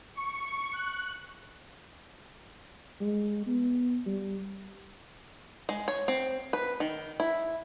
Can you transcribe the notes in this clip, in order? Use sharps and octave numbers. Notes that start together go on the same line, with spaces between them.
C#6
F#6
G#3
B3
G3
G#3
C#5
C4
B4
D#3
E4